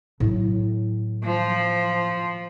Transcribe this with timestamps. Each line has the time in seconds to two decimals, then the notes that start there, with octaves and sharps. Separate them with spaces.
0.20 A2 F#3
1.24 F3